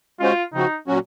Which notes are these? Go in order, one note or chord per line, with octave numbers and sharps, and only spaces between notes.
G#3 C#4 F4 F#4 C5
C#3 F3 C4 D#4 F#4
A#2 F#3 C#4 F#4